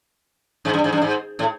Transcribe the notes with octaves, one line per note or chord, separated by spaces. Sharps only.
G#2
G2
G#2
G2
G#2
A2